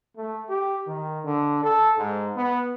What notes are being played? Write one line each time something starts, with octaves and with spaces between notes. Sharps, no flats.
A3
G4
D#3
D3
A4
G#2
B3